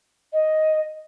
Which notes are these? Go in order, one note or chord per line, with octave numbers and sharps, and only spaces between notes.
D#5